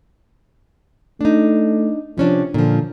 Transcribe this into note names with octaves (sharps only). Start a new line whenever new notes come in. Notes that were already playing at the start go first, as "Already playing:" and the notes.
A3 D4 D#4
C3 F3 C#4 D4
A#2 D3 F3